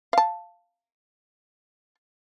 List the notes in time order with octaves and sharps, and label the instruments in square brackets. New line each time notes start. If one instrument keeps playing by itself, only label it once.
[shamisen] F5 A5